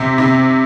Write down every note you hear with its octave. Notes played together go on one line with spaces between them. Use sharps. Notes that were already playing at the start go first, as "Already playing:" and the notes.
Already playing: C3
C3